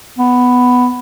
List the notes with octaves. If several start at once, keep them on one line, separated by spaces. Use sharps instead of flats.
B3